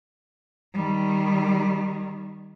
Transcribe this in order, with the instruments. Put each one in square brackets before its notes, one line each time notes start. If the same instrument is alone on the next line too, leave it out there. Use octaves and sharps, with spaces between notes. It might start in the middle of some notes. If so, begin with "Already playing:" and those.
[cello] D#3 G3